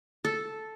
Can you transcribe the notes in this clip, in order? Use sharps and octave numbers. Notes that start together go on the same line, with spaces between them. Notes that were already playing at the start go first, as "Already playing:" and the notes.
A4